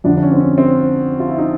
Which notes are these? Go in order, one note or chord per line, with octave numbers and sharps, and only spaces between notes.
F2 D3 F3 D4
D4
C#4
C4
C#4
C4
F4
E4
D#4